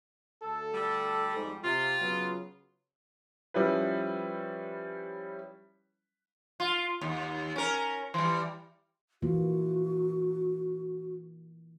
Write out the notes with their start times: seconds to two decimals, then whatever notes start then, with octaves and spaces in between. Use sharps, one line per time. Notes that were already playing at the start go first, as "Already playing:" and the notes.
0.43 D2 A4
0.74 G3
1.36 F2 G#2
1.64 C3 F4
2.00 C#3 F#3 B3
3.54 F3 G3 C#4 E4 B4
6.60 F4
7.01 D#2
7.56 C#4 A#4
8.14 E3 G3
9.22 E3 A#3 F4 F#4